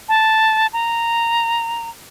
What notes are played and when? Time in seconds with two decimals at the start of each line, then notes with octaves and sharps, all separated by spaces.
0.09 A5
0.73 A#5